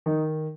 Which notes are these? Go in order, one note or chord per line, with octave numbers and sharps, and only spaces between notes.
D#3 D#4